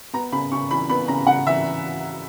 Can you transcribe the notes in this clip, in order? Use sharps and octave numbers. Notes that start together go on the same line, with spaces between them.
B3 A#5
C#3 B5
C#3 C#6
E3 B5
B3 B5
C#3 A#5
C#3 F#5
E3 E5